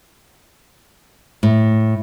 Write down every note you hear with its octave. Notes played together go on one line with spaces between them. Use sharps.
A2